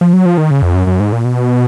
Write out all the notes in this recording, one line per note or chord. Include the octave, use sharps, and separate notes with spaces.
F3
F#3
F3
D#3
C#3
F2
F#2
F#2
G#2
A#2
B2